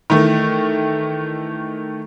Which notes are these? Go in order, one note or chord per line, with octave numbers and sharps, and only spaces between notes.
D#3 E3 A3